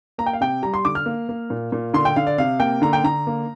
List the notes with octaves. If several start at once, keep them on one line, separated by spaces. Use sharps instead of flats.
A#3 A#5
G5
F5
C3 G5
G3 A#5
C6
D3 D6
F6
A#3
A#3
A#2
A#2
D3 C6
G5
D3 F5
D5
C3 F5
A#3 G5
D3 A#5
G5
D3 A#5
A#3